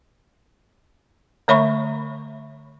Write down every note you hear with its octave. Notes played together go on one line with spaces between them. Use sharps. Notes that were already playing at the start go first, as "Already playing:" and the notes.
D3 A3 C#5 E5 B5 C#6